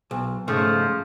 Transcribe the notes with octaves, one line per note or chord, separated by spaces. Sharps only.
B1
G#2 C#3 F3 A3